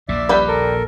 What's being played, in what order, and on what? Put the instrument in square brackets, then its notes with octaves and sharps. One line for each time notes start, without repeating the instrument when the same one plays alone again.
[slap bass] A#1 D#2 A#2 [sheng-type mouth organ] D5 E5
[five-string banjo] G3 G4 B4
[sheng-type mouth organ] A4 A#4